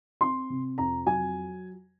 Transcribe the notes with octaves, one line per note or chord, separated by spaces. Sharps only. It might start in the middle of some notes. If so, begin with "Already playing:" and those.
C4 C6
C3
F2 A#5
F#3 G#5